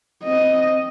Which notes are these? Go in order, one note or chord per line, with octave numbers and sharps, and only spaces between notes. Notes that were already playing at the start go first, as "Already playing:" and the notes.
C4 D#5